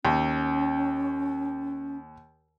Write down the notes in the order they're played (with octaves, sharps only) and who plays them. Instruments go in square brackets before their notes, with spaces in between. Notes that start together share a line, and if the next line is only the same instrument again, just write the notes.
[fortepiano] D#2 [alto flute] C#4